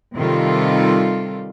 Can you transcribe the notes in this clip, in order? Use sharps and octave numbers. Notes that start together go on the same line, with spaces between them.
C3 D#3 G3 F4 A4